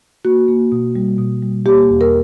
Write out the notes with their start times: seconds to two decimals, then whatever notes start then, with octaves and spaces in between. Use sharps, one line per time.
0.25 A#3 F#4
0.48 A#3
0.72 B2
0.95 G3
1.18 B2
1.42 G3
1.66 A#3 G4
1.89 E2
2.01 A#4